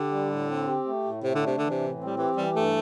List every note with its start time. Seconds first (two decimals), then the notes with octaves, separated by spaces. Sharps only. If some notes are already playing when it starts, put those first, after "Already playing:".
Already playing: D3 G4
0.11 G3
0.30 A2
0.48 C4
0.67 G4
0.85 A3
1.04 A2
1.23 C3 A3
1.35 D3
1.41 C3 D4
1.58 D3 E3
1.70 C3
1.80 A2
1.98 C4
2.06 G3
2.17 E3 G4
2.36 E3 G3
2.54 G2 A3